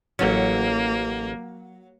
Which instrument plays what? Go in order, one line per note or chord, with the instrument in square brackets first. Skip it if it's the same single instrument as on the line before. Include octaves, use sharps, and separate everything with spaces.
[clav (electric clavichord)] A1 C#4 [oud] F#3 [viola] A#3